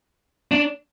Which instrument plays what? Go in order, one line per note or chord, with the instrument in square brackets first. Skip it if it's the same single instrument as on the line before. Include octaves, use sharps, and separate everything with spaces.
[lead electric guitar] D4